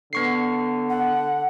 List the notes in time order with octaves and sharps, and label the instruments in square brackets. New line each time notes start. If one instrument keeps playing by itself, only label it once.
[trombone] D3 [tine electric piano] B3 C#6 C7
[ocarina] F#5